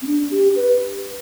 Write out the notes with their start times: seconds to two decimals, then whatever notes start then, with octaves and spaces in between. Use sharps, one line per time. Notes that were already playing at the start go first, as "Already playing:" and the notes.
0.02 C4
0.07 D4
0.31 G4
0.56 B4